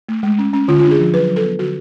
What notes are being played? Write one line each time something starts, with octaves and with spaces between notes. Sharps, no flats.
A3
G#3
C#4
C#4
D3 F4
D4 F4
G#4
F3
F#3 B4
F#3
A4
B3
D3 F#4